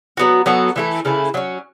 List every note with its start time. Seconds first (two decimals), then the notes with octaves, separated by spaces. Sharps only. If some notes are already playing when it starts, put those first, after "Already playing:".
0.17 F#3 B3 F#4
0.46 F#3 B3 F#4 A4
0.76 E3 A3 E4 A4
1.05 C#3 E3 A3 E4
1.34 F#3 A3 C#4